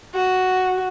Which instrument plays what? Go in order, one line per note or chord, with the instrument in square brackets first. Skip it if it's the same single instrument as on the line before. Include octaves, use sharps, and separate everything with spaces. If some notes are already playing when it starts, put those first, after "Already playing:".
[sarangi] F#4